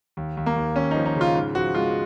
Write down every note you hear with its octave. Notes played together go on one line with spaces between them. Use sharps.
D#2
D#2
A#3
D#2
D#2 C#4
D#4
F3
D#4
C#3
F4
G#2
F3 F#4
G#3 F4